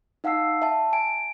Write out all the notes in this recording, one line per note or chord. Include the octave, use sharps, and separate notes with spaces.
D#4 F5 F#5 A5 E6 C7
E5 A5
G#5 D7